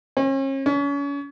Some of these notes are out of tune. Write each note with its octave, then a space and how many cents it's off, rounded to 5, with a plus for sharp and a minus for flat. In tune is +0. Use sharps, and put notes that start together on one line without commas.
C#4 -40
C#4 +35